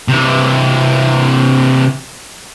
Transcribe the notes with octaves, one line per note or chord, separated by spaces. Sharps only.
C3 E3